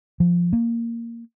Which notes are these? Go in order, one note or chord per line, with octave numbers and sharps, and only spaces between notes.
F3
A#3